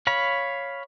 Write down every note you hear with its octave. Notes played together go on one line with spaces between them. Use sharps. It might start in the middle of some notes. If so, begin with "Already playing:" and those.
C#5 F5 B5